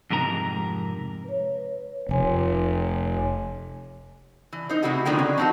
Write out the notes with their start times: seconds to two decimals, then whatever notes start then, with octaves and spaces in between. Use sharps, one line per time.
0.10 F2 G#2 C3 A#4 A#5
1.24 B4 C#5
2.09 F1 C#5 G#5 C6
4.53 E3
4.69 D#4 A#4 C5
4.83 C3 D#3 A3 E4 F#4 G#4
5.05 B2 D3 D#3 F3 G5
5.19 C#4
5.38 F3 A3 C4 D#4 F#4